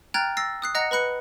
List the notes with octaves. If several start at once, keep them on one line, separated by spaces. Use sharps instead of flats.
G5 A#5 F6 F#6 G#6 A6
E6 A6 A#6 C7
D#6 F#6 C7
D#5 F#5 A#5 F#6 A#6 C#7
B4 B5 F#6 C#7